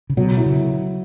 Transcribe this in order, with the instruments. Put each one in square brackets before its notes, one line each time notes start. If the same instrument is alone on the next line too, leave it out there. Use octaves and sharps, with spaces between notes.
[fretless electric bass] C#3
[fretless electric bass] B2 [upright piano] F#3
[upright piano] E4
[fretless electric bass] C#3